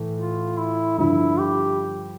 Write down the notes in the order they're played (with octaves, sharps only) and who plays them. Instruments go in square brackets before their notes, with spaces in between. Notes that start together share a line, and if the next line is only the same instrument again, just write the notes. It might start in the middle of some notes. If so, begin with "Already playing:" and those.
Already playing: [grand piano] A2 E3 A3
[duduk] F4
E4
[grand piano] G2 D3 F3 [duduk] E4
[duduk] G4